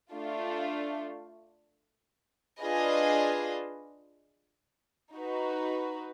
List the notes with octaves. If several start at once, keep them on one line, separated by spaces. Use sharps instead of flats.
A3 D4 F4
D4 F4 G#4 B4 D#5
D#4 F#4 B4